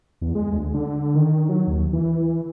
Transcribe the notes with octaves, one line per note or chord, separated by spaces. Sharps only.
E2
G#3
D2
D3
D#3
F#3
D#2
E3